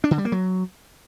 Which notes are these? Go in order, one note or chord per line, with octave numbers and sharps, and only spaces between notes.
D4
D3
G3
A#3
F#3